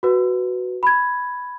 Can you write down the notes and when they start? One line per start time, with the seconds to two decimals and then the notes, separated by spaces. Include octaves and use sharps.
0.03 F#4 B4
0.83 B5 G#6